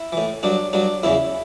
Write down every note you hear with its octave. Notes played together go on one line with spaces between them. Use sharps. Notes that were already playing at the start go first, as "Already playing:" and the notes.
Already playing: E4
A2 E3
G2 F#3 D4
G2 F#3 D4
E2 C#3 E3 E4